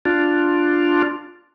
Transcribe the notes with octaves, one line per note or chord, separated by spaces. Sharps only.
D4 F4